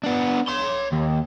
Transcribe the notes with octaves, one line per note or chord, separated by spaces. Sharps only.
B3 D4
C#5 C6
D#2